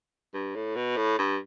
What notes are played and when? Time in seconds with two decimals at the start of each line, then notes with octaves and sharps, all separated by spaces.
0.34 G2
0.55 A2
0.76 B2
0.96 A2
1.18 G2